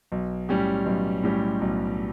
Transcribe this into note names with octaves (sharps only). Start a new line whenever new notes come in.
B1
A2 G3 C#4 G4
B1
A2 G3 C#4 G4
B1